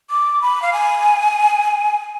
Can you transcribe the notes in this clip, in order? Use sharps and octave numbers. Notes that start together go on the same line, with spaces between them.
D6
B5
F5
G#5